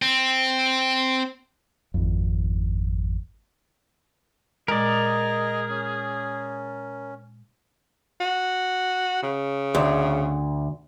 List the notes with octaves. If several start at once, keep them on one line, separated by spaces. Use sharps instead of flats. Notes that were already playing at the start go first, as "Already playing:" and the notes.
C4
G#1 F2
A#2 G#3 G#4 A#4 D5 D#5
C#4
F#4
C#3
D2